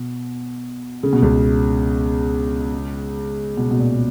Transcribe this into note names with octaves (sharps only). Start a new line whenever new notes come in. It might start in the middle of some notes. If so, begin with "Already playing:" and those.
Already playing: B2
C#3
B2
C#2 C#3
B2
B2
A#2